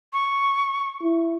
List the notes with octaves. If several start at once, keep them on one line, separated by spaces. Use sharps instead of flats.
C#6
E4